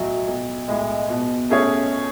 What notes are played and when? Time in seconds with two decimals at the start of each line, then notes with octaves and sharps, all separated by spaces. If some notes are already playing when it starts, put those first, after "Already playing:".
Already playing: B1 A2 F#3
0.27 B1
0.68 A2 G#3
1.09 B2
1.50 A3 C#4 G#4 C#5